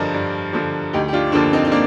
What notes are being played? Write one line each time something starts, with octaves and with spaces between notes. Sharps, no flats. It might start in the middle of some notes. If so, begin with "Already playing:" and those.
Already playing: G2 D3 F3 A#4 D5 D#5
G2
D3 F3
D2 D#4 G4
G4
D4 F4
D3 F3 A#3 D4
C4 D#4
D#4
A#3 D4